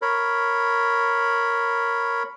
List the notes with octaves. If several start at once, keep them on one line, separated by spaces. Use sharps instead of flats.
A#4 C#5 B5